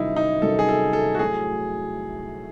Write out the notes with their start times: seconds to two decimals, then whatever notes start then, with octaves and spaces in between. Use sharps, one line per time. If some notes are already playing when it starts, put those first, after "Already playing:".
Already playing: C2 C3 D#3 F#3 C#4 D#4 E4
0.16 D#4
0.42 C2 C3 D#3 F#3 C#4 A4
0.59 G#4
0.69 A4
0.93 A4
1.15 F#4
1.19 A2 F#3 A3 G#4